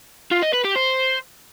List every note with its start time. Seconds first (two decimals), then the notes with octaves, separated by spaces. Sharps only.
0.32 F4
0.43 D#5
0.54 B4
0.65 G4
0.76 C5